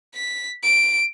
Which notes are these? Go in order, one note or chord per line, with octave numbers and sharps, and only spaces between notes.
B6
D7